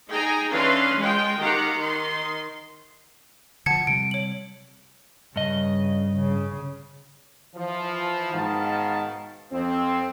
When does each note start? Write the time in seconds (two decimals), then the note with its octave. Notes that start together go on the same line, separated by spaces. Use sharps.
0.11 D#4 G#4 G5 G#5 A#5
0.51 E3 C#4 D4 B4 F5 C6
1.00 G#3 F4 G5
1.40 D#3 G4 F5 F#5 A#5
1.77 D#3 C6
3.66 D3 F3 F#5 A5 G#6 C#7
3.87 C3 G3 D7
4.11 C#5 F#7
5.36 G2 C#3 D#5
6.17 C#3
7.55 E3 F3
8.32 G#2 B2 D#3 F5 A5
9.52 F2 C4